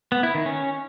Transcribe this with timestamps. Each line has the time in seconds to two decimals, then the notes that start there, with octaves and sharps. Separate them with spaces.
0.12 B3
0.23 E4
0.35 D#3
0.46 C#4